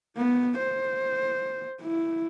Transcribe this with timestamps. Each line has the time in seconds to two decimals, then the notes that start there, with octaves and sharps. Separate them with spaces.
0.17 B3
0.59 C5
1.81 E4